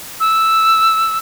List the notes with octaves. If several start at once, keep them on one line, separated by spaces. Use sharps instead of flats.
E6